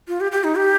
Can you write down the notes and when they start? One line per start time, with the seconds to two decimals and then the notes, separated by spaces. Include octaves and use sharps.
0.08 F4
0.21 G4
0.32 G4
0.44 D#4
0.57 G4